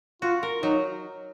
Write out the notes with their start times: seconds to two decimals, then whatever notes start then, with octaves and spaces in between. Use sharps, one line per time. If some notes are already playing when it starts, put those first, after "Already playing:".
0.22 F4 F#4
0.43 A#4
0.63 F#3 D#4